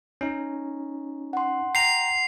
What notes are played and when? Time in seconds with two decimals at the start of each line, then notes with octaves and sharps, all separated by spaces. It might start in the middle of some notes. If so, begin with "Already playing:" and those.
0.21 C#4 D#4
1.33 F#5 C6
1.75 G5 A#5 C7 F7